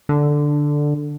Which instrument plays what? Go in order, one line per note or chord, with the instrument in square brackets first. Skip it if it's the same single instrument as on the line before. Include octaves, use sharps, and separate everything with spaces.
[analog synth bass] D3